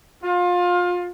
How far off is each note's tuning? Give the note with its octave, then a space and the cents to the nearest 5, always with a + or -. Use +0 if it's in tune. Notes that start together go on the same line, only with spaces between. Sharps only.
F4 +25